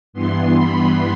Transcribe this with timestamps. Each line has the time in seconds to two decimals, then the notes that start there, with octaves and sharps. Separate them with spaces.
0.13 G2 E3 B3 C6
0.57 B5